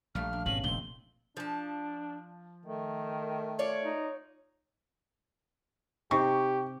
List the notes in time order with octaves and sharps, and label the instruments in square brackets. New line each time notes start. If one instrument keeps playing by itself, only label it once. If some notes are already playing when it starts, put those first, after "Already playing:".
[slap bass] A#1 [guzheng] G3 A3 A#3 [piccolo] F6
[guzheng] D4
[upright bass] G#1 [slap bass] B2 [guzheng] C#4 [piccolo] F#7
[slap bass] F1 [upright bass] A#2 [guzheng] D#3 C4 [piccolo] G7
[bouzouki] F3 A5 [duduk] D4
[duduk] D#3 [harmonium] A3
[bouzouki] F4 C#5 D5
[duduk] D#4
[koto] C3 [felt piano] D#4 [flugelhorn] G4 [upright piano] C#6